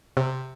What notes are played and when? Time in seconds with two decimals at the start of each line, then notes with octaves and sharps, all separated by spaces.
0.17 C3